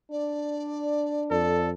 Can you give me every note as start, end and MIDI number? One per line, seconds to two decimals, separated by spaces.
0.11 1.55 62
0.11 1.23 74
1.31 1.74 41
1.31 1.71 69
1.31 1.70 74